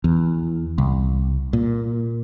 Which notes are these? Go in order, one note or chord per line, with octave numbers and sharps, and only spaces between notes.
E2
C2
A#2